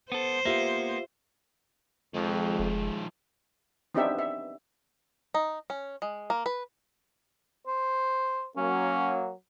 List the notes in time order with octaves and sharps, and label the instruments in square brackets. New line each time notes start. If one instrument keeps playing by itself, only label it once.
[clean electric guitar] B3 A4 [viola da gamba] C5
[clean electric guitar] A#3 B3 [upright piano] F4 G4 E5
[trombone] F2 [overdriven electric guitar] D#3 F3 [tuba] G#3
[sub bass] F1
[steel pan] B3 C4 D4 D#4 G4 E5
E5
[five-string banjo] D#4
C#4
G#3
A#3
B4
[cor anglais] C5
[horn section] F#3 A#3 [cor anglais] C#4